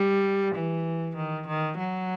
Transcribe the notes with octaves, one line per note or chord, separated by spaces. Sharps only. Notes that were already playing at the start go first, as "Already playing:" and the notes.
Already playing: G3
E3
D#3
D#3
F#3